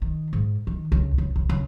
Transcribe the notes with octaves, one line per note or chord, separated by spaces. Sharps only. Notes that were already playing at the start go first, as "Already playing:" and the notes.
D#3
G#2
D#3
C#2
C#2
C#2
C#2